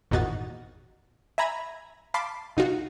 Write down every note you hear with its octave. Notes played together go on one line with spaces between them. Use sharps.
G#1 E2 A#2 D#4 F#4 A6
E5 G#5 A#5 B5 G#6 A#6
F5 A5 B5 C6 D6
C2 D#4 F4 F#4